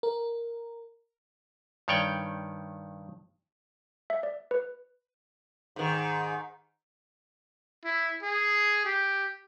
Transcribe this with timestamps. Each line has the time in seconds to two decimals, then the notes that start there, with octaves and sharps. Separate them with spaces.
0.03 A#4
1.88 G2 D#3 C#5 D5 G5
4.10 E5
4.23 D5
4.51 B4
5.76 G#2 D#3
7.85 E4
8.22 G#4
8.85 G4